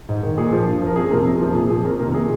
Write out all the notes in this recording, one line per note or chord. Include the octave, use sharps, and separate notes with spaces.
G#2
D#3
A#2 G#4
F3
G2
F3 A#4
F2 G#4
C3 F3 A#4
F2 G#4
C3 F3
A#2 G#4
F3 G#4
F2 A#4
C3 D#3 A#4
A#2 G#4